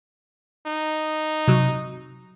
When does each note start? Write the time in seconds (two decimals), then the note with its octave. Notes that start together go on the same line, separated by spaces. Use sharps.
0.66 D#4
1.48 C3 F#3